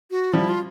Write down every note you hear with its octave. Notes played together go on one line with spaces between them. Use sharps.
F#4
F3 G3 E4
F4